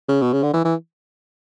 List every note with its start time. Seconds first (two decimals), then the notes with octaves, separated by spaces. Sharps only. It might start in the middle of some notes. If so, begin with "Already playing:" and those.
0.09 C#3
0.22 B2
0.33 C#3
0.43 D3
0.53 E3
0.64 E3